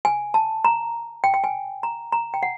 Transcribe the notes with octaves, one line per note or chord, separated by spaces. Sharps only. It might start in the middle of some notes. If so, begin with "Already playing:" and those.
G#5
A5
A#5
G5
G5
G#5
A#5
A#5
G5
F#5